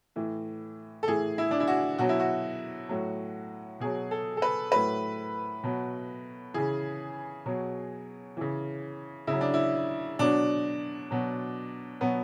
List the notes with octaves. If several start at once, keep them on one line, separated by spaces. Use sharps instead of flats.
A2 E3
A4
A2 E3 G#4
E4
D4
E4
F#4
B2 F#3 F#4
E4
F#4
A2 F#3
B2 F#3 G#4
A4
A4
B4
A2 F#3 B4
B2 F#3
C#3 E3 G#4
B2 F#3
C#3 E3
C#3 E4
F#3
D4
E4
B2 F#3 D4
B2 F#3
B2 F#3 B3